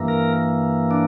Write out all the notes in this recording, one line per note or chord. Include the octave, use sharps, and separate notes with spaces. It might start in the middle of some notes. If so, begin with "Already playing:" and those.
Already playing: G2 E3 A#3
A#4
D4